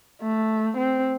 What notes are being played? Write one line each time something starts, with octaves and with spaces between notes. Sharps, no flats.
A3
C4